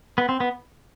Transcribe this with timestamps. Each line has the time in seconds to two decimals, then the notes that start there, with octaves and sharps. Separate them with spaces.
0.18 B3
0.29 C4
0.40 B3